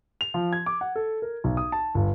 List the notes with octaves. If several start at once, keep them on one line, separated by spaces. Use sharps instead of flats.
F7
F3
G#6
D6
F#5
A4
A#4
B1
D#6
A5
G1